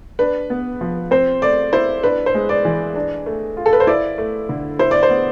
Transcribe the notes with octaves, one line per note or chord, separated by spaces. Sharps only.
D4 B4
B3
F3
C4 C5
A3 D5
E4 C5
D4 B4
C5
G#3
D5
E3
D4
A3
F4
A4
B4
C5
E4 D5
A3
D3
E4 C5
D5
C5
B3